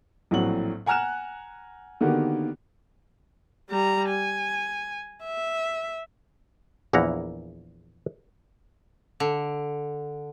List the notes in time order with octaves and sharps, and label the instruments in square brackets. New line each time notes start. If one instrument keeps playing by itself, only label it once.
[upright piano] A#1 A2 F#3 C4 F#4 F#7
F#5 G#5 A#5 F6 F#6 E7
D3 D#3 A#3 B3 F#4 G4
[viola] G3 A#5
G#5
E5
[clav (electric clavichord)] A#1 E2 A#3 E4 F#5 A#5
[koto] D3